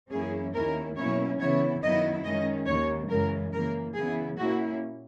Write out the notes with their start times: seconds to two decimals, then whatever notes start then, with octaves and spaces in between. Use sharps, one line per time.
0.11 F#2 E3 A#3 C#4 E4 G#4
0.54 D#2 D#3 A#3 C#4 E4 A#4
0.96 B2 F#3 A#3 C#4 E4 C#5
1.39 C#3 E3 B3 E4 C#5
1.81 F#2 D#3 F#3 B3 E4 D#5
2.24 D#3 G#3 C#4 D#5
2.66 D#2 D#3 A#3 C#5
3.09 F#2 C#3 E3 G#3 A#4
3.52 C#3 E3 A#3 A#4
3.94 C#3 E3 B3 E4 G#4
4.37 A#2 A#3 C#4 E4 F#4